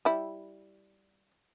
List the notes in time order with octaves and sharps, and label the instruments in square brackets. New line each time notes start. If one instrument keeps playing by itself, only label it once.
[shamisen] G3 E4